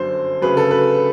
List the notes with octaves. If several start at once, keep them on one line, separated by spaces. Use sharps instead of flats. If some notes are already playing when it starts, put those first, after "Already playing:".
Already playing: G1 F#2 D3 F#3 C5
D2 C#3 F#3 B4
A4
B4